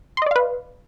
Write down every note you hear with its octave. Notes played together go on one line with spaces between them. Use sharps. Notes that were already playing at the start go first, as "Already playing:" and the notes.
B4 D5 D#5 F5 C6